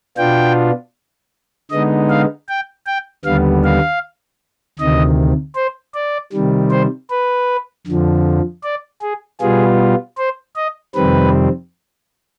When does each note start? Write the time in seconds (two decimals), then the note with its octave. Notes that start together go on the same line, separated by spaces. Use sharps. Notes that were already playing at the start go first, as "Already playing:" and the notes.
0.17 B2 B3 D4 F4 G5
1.71 D3 G#3 B3 D#4 D#5
2.10 F5
2.49 G5
2.87 G5
3.25 D#2 D3 G3 B3 F5
3.64 F5
4.79 D2 C3 D#3 D#5
5.56 C5
5.94 D5
6.33 C3 D#3 G3
6.71 C5
7.10 B4
7.87 F2 D3 F3
8.63 D5
9.02 G#4
9.41 B2 G3 B3 F4 G#4
10.18 C5
10.56 D#5
10.95 F2 C3 D#3 G3 C4 B4